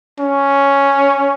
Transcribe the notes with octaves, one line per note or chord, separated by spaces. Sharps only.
C#4